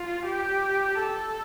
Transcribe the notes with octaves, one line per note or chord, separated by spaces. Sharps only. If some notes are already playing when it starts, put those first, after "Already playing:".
Already playing: F4
G4
A4